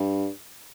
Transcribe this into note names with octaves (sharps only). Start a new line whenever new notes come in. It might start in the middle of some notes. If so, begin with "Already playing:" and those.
Already playing: G2